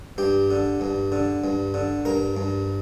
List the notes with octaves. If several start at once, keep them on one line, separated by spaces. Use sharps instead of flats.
G2 G4
D3
G2
D3
G2
D3
G2 A#4
G2